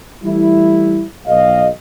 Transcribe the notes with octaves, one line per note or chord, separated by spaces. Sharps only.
E3 G3 A3 E4
B1 D#5 F5